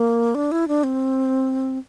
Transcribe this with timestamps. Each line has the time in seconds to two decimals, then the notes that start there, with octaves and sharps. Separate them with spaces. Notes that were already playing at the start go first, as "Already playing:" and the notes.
Already playing: A#3
0.35 D4
0.52 E4
0.68 D4
0.83 C4